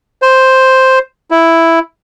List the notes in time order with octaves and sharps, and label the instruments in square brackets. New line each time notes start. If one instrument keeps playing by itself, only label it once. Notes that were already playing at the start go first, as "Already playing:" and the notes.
[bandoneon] C5
E4